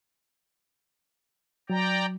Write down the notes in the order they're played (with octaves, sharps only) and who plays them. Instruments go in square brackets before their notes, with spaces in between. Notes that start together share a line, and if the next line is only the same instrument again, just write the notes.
[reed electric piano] F#3 [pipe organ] D5 G5 A#5